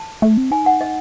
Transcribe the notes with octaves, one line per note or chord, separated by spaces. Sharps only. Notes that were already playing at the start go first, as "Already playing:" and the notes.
Already playing: A5
A3
C4
D#4 G#5
F#5
D#5